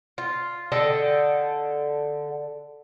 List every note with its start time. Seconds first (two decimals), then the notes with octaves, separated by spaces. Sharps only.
0.18 F4
0.72 D3 A4 D#5 G5